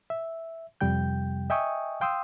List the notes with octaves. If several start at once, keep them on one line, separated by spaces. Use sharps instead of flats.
E5
F2 C3 G3 G5 G6
D#5 E5 G5 G#5 C#6 D#6
F5 G5 C6 D#6 E6